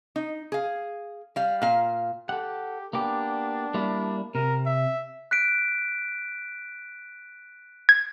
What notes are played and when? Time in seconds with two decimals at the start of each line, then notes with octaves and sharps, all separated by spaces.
0.16 D#4
0.52 G#4 F5
1.36 G3 F5
1.62 A#2 F5
2.29 G4 A4 F#5
2.93 A#3 B3 D4 G4
3.74 G3 A#3 E4
4.35 C3 A#4
4.66 E5
5.31 F#6 B6 D7
7.89 G#6